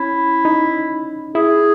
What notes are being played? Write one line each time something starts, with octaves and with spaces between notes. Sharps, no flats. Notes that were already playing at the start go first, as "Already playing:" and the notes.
Already playing: C#4 E4
D#4
E4 G#4